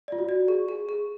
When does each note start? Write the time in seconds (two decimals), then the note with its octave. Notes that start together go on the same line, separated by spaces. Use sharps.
0.08 F4 D5
0.19 F#4
0.29 D5
0.48 G#4
0.68 G#4
0.89 G#4